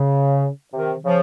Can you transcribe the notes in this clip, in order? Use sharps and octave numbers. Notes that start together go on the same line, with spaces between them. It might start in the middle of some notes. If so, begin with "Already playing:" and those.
Already playing: C#3
C3 D#3
C#3 F3